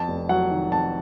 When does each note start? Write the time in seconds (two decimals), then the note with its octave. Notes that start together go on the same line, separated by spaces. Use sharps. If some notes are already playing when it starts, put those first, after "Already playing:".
Already playing: F2 A5
0.08 F1
0.29 F#3 F#5
0.51 D#3
0.72 F2 A5